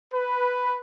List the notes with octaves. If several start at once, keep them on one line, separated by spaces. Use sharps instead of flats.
B4